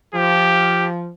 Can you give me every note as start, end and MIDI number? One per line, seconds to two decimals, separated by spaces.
0.14 1.10 53
0.14 0.87 67